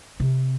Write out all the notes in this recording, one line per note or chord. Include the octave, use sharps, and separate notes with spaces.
C3